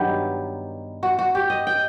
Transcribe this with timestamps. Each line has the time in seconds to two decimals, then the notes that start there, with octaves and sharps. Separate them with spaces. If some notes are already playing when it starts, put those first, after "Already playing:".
Already playing: G2 D#3 F#3 B3 G4
1.03 F#4
1.19 F#4
1.35 G4
1.50 D#5
1.67 G5